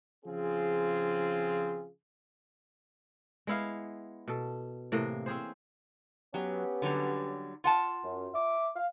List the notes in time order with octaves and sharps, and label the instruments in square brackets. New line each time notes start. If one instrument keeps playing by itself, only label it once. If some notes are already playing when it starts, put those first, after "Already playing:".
[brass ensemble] C#3 F3 C4 F4 G#4
[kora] G#3 B3 E4 F5
B2 A4
A2 C3 E3 A#3
C4 C#4 G#4 C5
[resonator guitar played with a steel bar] F#3 [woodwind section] B3 C#4 G4
[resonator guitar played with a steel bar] D3 F#3 G3
F4 F#5 A5
[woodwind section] F#2
E5 D6
F5